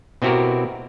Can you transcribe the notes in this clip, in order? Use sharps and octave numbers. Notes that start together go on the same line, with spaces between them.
B2 C4 E4 F#4 G4 A#4